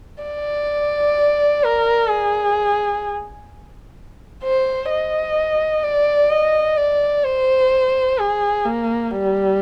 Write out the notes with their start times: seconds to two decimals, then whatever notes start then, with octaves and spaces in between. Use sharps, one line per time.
0.23 D5
1.64 A#4
2.10 G#4
4.44 C5
4.90 D#5
5.83 D5
6.30 D#5
6.77 D5
7.24 C5
8.18 G#4
8.65 A#3
9.11 G3